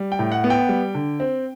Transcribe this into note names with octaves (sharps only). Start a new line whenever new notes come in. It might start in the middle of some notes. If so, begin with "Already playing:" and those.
Already playing: G3
G5
A2
F#5
B3
G5
G3
D3
C4